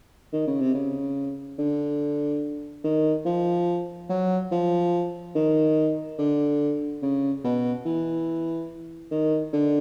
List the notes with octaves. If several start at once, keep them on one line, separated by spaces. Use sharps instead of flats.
D#3
C#3
C3
C#3
D3
D#3
F3
F#3
F3
D#3
D3
C#3
B2
E3
D#3
D3